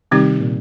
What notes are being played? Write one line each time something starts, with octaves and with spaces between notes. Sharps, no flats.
C3 D#3 G3 C4 D#4 G4
A#2